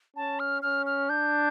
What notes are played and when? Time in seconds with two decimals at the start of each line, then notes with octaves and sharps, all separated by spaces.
0.16 C#4 A5
0.40 F6
0.62 C#4 F6
0.86 F6
1.09 D4 G6